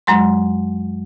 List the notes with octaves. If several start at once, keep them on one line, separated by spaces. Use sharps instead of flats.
F#2 F#3 G#3 C6